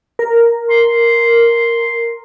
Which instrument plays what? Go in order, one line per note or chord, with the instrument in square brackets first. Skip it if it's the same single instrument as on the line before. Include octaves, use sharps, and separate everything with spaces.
[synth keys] A#4
[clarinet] C6